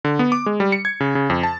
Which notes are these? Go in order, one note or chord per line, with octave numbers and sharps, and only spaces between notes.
D3
B3
D6
G#3
G3
C#7
G#6
C#3
C#3
F2
A5